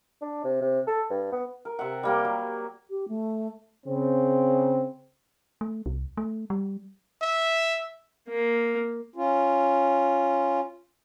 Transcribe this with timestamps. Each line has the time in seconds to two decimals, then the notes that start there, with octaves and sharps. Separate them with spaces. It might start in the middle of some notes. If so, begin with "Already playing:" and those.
0.22 D4
0.44 C3
0.61 C3
0.87 A4
1.10 G2
1.32 B3
1.65 A#4
1.79 C3 E5 F#5
2.03 G3 A#3 G5
2.25 F#3
2.90 G4
3.08 A3
3.86 C#3 C4
5.61 A3
5.86 C2
6.17 A3
6.50 G3
7.22 E5
8.29 A#3
9.16 C#4 F4